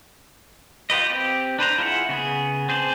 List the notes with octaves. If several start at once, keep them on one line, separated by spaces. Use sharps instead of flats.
F4 G4 B4 D#5
C4 G4
D4 B4 C5 A#5
E4 F4 G#4 E5 F#5
C#3 B3 G#4
C4 G#4 C5 D5 A5